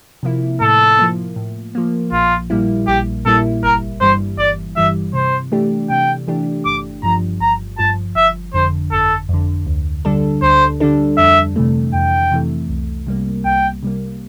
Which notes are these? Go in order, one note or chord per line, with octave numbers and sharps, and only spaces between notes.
C3 F3 A#3 E4
A2 A4
F3 A#3
A2
F3 A#3
A#1 F4
A#2 G3 A#3 E4
A#1 G4
A#2 G3 A#3 E4 A4
G1 A#4
G2 E3 G3 C5
G1 D5
G2 E3 G3 E5
C3 C5
E3 A3 D4 G4
C3 G5
E3 A3 D4 G4
G1 D6
G2 F3 A#5
G1 A#5
G2 F3 A5
G1 E5
F2 D3 C5
G1 A4
F2 D3
D2
D3 G3 D4 A4
D2 C5
D3 G3 D4 A4
F2 E5
C3 E3 A3
F2 G5
C3 E3 A3
C2
C3 G3 A#3
C2 G5
C3 G3 A#3